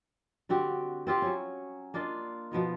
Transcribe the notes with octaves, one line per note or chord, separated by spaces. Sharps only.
D3 C4 F#4 G4
C4 F4 G4
F#3 C#4
A#3 D4 F4 D#5
B2 F3 B3 D#4